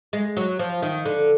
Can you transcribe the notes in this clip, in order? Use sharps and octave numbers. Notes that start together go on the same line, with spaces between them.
G#3
F#3
F3
D#3
D3